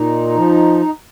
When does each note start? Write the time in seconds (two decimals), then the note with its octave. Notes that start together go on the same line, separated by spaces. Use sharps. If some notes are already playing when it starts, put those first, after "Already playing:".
Already playing: A#2 D#4
0.37 F3